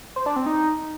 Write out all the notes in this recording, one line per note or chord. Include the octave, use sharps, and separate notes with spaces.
C5
D4
C4
D#4